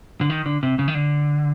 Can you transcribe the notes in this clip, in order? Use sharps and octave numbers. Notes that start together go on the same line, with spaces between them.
D3
D#3
D3
C3
C#3
D#3
D3